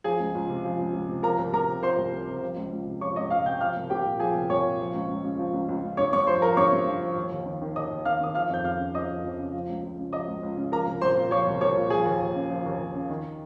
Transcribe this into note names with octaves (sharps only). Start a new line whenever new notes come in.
F3 G#4 G#5
C#2
C#2
C3
F3
C#2
C#2
C3
F3 A#4 A#5
C2
C2 A#4 A#5
C3
F3 C5 C6
C2
C2
C3
F3
C#2
C#2
C3
F3 C#5 C#6
C#2 D#5 D#6
C#2 F5 F6
C3 G5 G6
F3 F5 F6
C2
C2 G4 G5
A#2
F3 G#4 G#5
C2
C2 C#5 C#6
A#2
F3
C#2
C#2
C#3
F3
C#2
C#2
C#3
G2 C#5 C#6
G2 C#5 C#6
F3 C5 C6
F3 A#4 A#5
G2 C#5 C#6
G2
F3
F3
D#2
D#2
D#3
D#3
D#2 D#5 D#6
D#2
D#3 F5 F6
D#3 D#6
F3 F5 F6
F2 G6
F2 F5 F6
C#3
F3 D#5 D#6
F2
F2
C#3
F3
C#2
C#2
C#3
F3 D#5 D#6
C#2
C#2
C#3
F3 A#4 A#5
C2
C2 C5 C6
A#2
F3 C#5 C#6
C2
C2 C#5 C#6
A#2
F3 G#4 G#5
D#2
D#2
C#3
F3
D#2
D#2
C#3
D#3